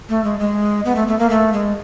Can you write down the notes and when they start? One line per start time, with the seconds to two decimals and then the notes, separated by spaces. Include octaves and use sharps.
0.09 A3
0.24 G#3
0.40 G#3
0.85 B3
0.96 A3
1.08 A3
1.19 A#3
1.30 A3
1.53 G#3